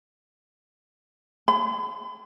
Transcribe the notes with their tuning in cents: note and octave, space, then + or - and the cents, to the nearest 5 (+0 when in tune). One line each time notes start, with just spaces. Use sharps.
B5 +45